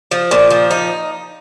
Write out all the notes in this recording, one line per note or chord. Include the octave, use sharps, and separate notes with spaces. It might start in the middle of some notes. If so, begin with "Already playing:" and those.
F3
A#2
F3
D#4